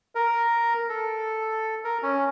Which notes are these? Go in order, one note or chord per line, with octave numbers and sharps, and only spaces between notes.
A#4
A4
A#4
C#4